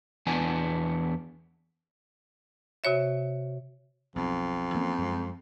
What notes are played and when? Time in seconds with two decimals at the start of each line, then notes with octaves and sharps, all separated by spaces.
0.27 E2 B3 D4 G#5
2.84 C3 F#4 C#5 E5
4.16 B1 F2
4.74 E3 A#3 C#4
4.98 F#2 G#3